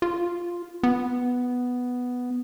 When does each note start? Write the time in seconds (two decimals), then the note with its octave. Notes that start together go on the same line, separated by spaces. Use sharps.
0.02 F4
0.83 B3